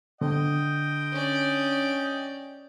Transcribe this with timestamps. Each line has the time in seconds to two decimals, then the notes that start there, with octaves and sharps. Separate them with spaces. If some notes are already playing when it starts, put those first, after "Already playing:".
0.21 D3 D#5 G5
1.12 C#4 D5